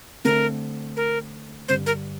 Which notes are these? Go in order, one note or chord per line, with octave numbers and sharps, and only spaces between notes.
D3 A3 C4 A#4
A#4
G2 D3 G3 C5
A#4